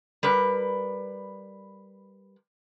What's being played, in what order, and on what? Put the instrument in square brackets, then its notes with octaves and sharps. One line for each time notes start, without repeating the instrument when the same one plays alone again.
[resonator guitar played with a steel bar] G3 A#4 B4